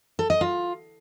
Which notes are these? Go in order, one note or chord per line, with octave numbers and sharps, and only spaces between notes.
A4
D#5
F4